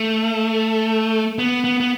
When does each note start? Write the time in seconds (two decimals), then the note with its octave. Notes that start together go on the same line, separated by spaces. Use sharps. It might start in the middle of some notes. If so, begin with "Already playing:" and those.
Already playing: A3
1.39 B3
1.64 B3
1.80 B3